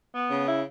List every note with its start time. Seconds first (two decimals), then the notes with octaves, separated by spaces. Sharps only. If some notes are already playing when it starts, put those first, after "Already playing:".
0.13 B3
0.30 C#3
0.47 E4